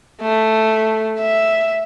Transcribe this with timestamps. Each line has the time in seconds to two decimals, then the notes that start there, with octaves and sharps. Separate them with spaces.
0.22 A3
1.20 E5